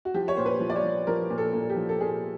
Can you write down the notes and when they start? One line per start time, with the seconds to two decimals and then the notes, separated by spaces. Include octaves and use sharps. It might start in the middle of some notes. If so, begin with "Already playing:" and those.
0.05 F#4
0.14 F3 G4
0.28 C#5
0.37 A#2 C5
0.46 B4
0.60 F3
0.70 D5
0.76 C#5
0.84 F3
1.07 F3 A#4
1.30 A#2
1.38 A4
1.53 A#2
1.69 G4
1.76 F3
1.89 A4
2.00 A#2 G#4